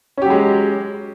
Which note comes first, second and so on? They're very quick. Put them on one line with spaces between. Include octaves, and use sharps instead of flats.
C#4 G4 F#3 G#3